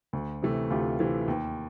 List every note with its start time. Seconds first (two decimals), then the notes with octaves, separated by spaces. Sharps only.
0.13 D2
0.43 C3 E3 A3
0.70 D2 F4 G4
0.99 C3 E3 A3
1.28 D#2